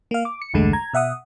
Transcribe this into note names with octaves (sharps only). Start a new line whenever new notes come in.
A#3 F5
D6
C#7
B1 E2 G2 D3 G#3 A3
A#5 G#6
B2 E5 F#5 D#6